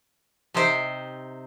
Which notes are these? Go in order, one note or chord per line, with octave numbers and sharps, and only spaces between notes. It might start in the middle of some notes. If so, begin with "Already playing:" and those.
C3 C4 D#4 G4 C5